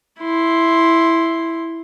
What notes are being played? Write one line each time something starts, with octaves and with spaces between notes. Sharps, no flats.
E4 C6